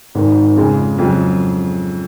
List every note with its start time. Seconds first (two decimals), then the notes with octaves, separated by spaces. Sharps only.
0.15 G#1 G#2 D#3
0.56 F2 C#3 G#3
0.98 F2 C#3 F#3